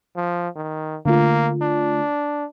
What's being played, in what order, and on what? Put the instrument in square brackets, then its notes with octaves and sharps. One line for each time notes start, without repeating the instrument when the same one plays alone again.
[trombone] F3
D#3
[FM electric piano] D3 A3 F4 [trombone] A#3
[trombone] D4